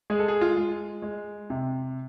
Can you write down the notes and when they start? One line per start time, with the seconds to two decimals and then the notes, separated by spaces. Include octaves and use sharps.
0.10 G#3 G#4
0.19 A4
0.28 G#4
0.41 F4
0.57 G#3
1.02 G#3
1.50 C3